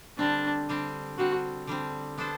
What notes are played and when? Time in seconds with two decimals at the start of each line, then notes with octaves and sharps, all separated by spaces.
0.18 D3 G3 C4 D4
0.69 D3 G3 C4
1.18 D3 G3 C4 F#4
1.67 D3 G3 C4
2.17 B3 D4 A4 C5